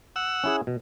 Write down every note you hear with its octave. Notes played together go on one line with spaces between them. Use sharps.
F#5 E6
C#4 E4 G#4
B2